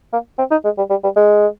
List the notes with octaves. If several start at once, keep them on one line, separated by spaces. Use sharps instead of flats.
A#3
C4
D#4
G#3
G3
G3
G3
G#3